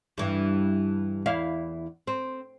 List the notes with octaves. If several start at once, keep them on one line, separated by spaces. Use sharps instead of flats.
G2 E3
E2 E4 F5
C4